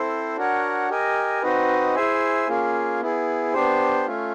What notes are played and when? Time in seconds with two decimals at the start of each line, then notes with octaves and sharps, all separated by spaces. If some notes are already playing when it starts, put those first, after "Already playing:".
Already playing: C4 E4 A4 C5
0.36 D4 F#4 A#4 C#5 F#5
0.89 G4 A#4 D#5 G#5
1.42 C4 D#4 F#4 B4 D#5
1.95 E4 G#4 C5 E5 G#5
2.48 A#3 C#4 F4 G#4
3.01 B3 E4 G#4
3.53 B3 D4 G4 C5
4.07 A3 C#4 F4